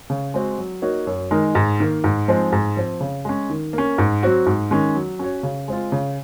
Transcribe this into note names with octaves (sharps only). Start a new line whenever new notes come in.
C#3
G#3 C4 F#4
F#3
A#3 D#4 F#4 C#5
F#2
D#3 G#3 D#4 A#4
G#2
D#3 A#3
G#2
F3 G#3 C4 D#4
G#2
F3 C4
C#3
G#3 C#4
D#3
A#3
C#4
G#2
F#3 C4 F#4
G#2
D#3 G#3 C#4
F#3
C#4 F#4 C#5
C#3
G#3 C4 F4
C#3